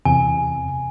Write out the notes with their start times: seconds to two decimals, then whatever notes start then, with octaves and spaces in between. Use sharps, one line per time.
0.05 E2 C3 G#5